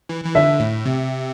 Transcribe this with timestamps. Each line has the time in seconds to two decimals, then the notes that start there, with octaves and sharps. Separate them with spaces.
0.09 E3
0.24 E3
0.35 D3 E5
0.60 A2
0.86 C3